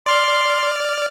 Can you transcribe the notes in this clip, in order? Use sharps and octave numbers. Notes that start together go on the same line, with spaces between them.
D5 C6 F6